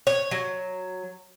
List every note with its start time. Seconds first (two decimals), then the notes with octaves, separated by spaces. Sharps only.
0.07 C#5
0.31 F#3